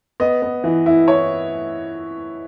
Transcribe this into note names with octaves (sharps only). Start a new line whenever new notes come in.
B3 D#5
B3
E3
E4
E4 C#5